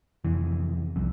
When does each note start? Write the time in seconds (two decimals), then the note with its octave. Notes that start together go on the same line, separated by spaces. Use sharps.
0.25 F1 B1 F2 E3
0.96 F1 C2 F2